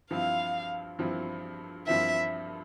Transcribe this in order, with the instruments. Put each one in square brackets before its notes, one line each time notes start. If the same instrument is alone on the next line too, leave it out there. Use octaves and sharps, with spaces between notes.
[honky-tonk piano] G2 F3 C4 E4 [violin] F5
[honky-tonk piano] G2 F3 C4 E4
[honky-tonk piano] G2 F3 C4 E4 [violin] E5